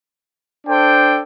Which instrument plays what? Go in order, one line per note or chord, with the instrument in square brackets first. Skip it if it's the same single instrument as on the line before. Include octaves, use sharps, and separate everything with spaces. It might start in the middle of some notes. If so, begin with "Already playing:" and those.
[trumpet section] D4 A4 C5 G5